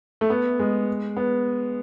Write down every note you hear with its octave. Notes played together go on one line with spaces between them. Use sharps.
A3
B3
G#3
B3